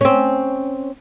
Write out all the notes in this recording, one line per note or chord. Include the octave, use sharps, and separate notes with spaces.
C4 C#4